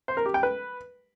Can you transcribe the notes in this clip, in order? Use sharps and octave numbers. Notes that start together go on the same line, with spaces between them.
C5
A#4
G4
G5
B4